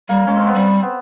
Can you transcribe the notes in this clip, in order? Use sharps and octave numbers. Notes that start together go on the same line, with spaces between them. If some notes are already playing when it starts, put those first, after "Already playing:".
G3 A#3
G#3 C#4
C4
B3
G3 C4
B3